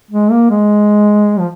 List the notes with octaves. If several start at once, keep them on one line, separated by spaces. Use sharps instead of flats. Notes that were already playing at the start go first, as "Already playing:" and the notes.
G#3
A#3
G#3
F3